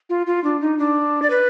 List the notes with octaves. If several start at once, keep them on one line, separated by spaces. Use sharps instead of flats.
F4
F4
D4
D#4
D4
D5
B4